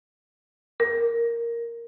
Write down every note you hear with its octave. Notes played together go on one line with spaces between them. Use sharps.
A#4